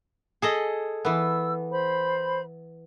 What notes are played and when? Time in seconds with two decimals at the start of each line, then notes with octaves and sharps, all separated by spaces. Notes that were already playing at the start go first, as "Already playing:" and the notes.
0.42 G#4 A4 D#5
1.05 E3 B3 E6
1.71 C5 B5